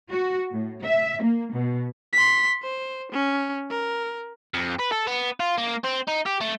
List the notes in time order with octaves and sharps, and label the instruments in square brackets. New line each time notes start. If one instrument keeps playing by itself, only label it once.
[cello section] F#4
A2
E5
A#3
B2
[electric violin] C6 B6
C5
C#4
A#4
[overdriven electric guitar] F2
B4
A4
B3
F4
A#3
C4
D#4
G4
A3